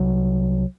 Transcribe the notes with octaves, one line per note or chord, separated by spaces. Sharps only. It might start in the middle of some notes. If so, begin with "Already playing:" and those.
Already playing: C2 C3 F#3